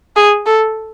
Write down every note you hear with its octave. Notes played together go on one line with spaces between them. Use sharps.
G#4
A4